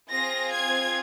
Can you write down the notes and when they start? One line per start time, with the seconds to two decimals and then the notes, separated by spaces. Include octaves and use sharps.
0.10 C4 F4 G#4 A#6
0.52 G#6